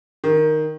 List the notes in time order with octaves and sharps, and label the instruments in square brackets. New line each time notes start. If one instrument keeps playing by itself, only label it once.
[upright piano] D#3